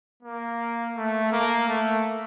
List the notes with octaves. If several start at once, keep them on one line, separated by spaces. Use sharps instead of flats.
A#3
A3
A#3
A3